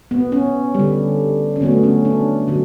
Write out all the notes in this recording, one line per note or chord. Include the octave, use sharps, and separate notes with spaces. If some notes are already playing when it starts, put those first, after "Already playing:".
B3
C#4
D3 G3
C#4
D3 F#3 A3 B3
C#4
D4
D3 F#3